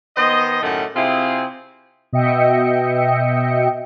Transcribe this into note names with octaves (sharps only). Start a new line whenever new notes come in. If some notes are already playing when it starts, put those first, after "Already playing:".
D#3 B3 C5 D#5
F#2 A2 D#3 A3 G4 F#5
C3 C4 E4 F4 G#4
B2 D#5 E5 G5 C#7